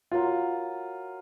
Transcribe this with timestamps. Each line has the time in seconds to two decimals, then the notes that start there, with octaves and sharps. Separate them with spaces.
0.12 F4 F#4 A#4 C#5 F#5 A#5